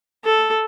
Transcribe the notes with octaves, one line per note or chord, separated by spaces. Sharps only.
A4